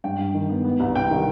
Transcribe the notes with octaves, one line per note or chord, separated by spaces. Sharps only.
G2 G5
G2
D#3
B3
B3
C2
C3 G5
D#3